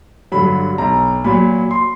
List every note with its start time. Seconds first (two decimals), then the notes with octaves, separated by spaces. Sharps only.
0.32 G2 D3 F#3 B5
0.78 B1 A#5
1.24 A#2 F#3 B5
1.71 C6